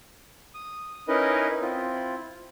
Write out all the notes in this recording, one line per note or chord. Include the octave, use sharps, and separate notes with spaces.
D#6
C#4 D#4 E4 A#4 B4 D#5
C4 E4 F4